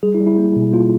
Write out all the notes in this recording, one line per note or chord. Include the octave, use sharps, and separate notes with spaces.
G3 G#4
E4
G3
E4
A#3
B2
A#3 F4